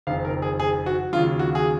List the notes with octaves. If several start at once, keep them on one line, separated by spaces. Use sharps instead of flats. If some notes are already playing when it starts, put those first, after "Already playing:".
F#1 F2 D#3 F5
A#4
G#4
G#4
F#4
D#2 C#3 F#3 F4
F#4
G#4